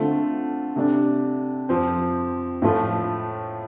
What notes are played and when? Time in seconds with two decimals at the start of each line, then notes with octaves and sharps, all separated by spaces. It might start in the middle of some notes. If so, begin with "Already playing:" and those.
Already playing: D3 A3 C4 F4
0.76 C3 A3 D4
1.69 F2 F3 C4
2.62 A2 F3 A3 F4